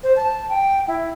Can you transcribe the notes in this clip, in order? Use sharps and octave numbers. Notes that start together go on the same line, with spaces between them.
C5
A5
G5
E4